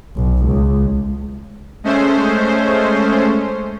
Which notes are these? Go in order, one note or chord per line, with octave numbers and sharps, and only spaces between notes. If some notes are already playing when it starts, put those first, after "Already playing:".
B1
C#2
G#3 A3 C#4 C5